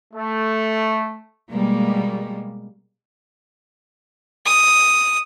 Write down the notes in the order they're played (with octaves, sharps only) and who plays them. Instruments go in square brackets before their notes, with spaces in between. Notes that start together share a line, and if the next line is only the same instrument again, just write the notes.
[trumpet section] A3
[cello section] B2 G3 G#3 A#3
[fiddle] D#6